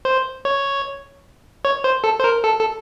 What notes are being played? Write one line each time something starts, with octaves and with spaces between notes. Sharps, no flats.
C5
C#5
C#5
C5
A4
C5
A#4
A4
A4